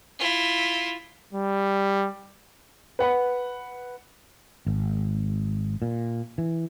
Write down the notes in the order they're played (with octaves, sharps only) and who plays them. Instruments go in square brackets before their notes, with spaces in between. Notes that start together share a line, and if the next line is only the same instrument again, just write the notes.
[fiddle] E4 F4
[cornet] G3
[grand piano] B4 F#5 B5
[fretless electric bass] G#1
A#2
E3